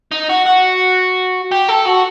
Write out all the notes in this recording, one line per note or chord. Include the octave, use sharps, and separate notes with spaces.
D#4
F#4
F#4
G4
A4
F#4